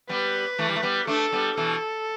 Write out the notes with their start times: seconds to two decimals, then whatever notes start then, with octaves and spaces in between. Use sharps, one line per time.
0.09 G3 B3 B4
0.59 E3 A3
0.69 G3
0.76 A3
0.83 G3 B3
1.07 A3 D4 A4
1.32 G3 B3
1.57 B2 E3 A4